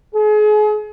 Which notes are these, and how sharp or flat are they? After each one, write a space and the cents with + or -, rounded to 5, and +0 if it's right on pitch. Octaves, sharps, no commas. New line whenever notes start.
G#4 +35